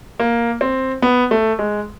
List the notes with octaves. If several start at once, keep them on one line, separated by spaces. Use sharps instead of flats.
A#3
C4
B3
A3
G#3